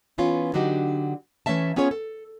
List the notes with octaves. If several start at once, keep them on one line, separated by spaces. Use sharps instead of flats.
E3 B3 C#4 F4
D3 F#3 D4 D#4 F#4 G4
E3 A3 C#4 E5 A5
B3 C#4 F4 G#4 C#5
A4